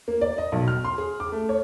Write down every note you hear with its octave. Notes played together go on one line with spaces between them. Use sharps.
A#3
D5
D#5
B1
F6
C6
G#4
D6
A3
C#5